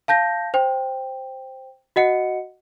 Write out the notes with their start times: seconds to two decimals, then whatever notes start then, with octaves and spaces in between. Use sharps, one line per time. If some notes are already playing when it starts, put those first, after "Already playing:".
0.08 F5 A5 G6 A#6
0.54 C5 G5
1.96 F#4 D#5 F#5 C#7